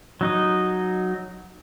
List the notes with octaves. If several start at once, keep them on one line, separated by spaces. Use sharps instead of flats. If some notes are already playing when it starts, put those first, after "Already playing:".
F#3 D#4 D#5